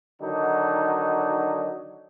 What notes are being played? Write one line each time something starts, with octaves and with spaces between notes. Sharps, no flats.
D3 D#3 F#3 D4 D#4 F#4